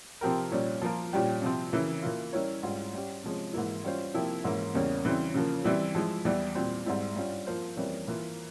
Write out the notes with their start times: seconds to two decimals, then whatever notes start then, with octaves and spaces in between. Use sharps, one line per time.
0.21 C3 F3 C4 G4 A#4
0.51 A#2 G3 C#4
0.82 F3 A#3 F4 A#4
1.13 A#2 G3 C#4 G4
1.42 C3 F3 C4
1.72 C#3 E3 A#3 E4
2.02 E3 A#3 F4
2.33 G3 C#4 E4 A#4 C#5
2.63 G#2 G3 C#4 F4
2.93 G3 C#4 G4
3.23 C3 F3 G#3 C#4
3.53 G#2 E3 A#3 E4
3.84 G3 C#4 F4 C5
4.14 C3 F3 A#3 E4 G4
4.44 G#2 E3 A#3 C#4
4.74 E2 C#3 G3 A#3 C#4
5.05 C#3 E3 G3 C4
5.34 C#3 F3 A#3
5.64 E3 G3 C4 E4
5.95 F3 G#3 E4
6.25 E2 E3 G3
6.55 A#2 G3 C4
6.86 G#2 G3 C4 E4
7.15 G2 G3 C#4 F4
7.47 F3 A#3 F4 C5
7.76 F2 E3 G3 A#3 C#4
8.07 E3 A#3 F4 A#4